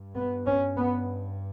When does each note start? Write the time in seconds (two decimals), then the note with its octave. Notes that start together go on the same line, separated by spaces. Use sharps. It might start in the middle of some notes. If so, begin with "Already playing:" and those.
Already playing: G2
0.15 B3
0.46 C#4
0.77 B3